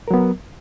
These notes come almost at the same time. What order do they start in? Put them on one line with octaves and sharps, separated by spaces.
A#4 F#3 B3